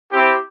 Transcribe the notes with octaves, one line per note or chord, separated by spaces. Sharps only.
C4 E4 G4